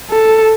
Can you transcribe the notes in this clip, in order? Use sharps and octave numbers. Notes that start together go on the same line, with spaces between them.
A4